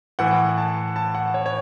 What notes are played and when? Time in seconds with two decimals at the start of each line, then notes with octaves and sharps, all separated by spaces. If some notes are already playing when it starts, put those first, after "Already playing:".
0.19 A2 E3 F#5
0.58 A5
0.96 A5
1.15 F#5
1.34 C#5
1.46 C#5